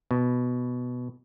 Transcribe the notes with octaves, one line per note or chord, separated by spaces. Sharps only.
B2